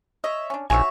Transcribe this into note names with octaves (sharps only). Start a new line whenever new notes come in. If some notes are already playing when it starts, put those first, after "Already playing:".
C#5 D#5 E5
C#4 D4
A#1 C3 D#4 F#4 C#5 E5 G#5